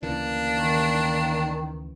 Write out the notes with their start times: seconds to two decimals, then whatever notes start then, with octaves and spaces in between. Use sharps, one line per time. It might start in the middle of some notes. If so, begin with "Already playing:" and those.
0.03 D2 C#3 E3 A#3 D4
0.50 D#3